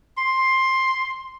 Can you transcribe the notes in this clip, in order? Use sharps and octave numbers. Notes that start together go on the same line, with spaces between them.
C6